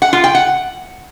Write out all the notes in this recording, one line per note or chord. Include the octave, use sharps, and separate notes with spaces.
F#5
F4
G5
F#5